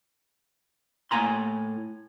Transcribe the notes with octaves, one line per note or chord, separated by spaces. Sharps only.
A2 A#3 G#5 A#5 C6